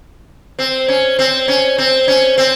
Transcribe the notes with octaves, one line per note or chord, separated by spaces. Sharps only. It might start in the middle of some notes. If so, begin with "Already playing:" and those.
C4
C#4
C4
C#4
C4
C#4
C4